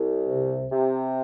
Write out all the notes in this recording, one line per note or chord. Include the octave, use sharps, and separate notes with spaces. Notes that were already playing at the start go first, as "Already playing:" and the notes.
Already playing: C2
C3
C3